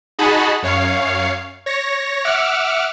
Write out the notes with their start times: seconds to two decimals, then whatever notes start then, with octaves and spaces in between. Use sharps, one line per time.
0.19 D#4 F#4 G#4 D#5 A5 B5
0.63 F#2 C#5 F5 C7
1.66 C#5 A#6
2.25 E5 F#5 D6 E6 F6